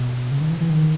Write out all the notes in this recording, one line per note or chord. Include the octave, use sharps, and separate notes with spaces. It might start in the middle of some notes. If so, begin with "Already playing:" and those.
Already playing: B2
C#3
D#3
E3
E3
D#3